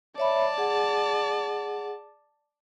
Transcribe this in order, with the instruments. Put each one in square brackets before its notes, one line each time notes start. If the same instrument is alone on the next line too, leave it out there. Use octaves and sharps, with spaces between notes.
[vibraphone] C#5 E5 B5 [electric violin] D5 A5
[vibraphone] G#4 F#5